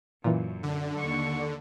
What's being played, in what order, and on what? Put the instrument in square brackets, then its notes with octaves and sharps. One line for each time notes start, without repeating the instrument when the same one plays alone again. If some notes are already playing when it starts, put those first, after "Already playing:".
[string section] F#2 [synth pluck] A#2 E3
[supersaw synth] D3
[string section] D#2 C#6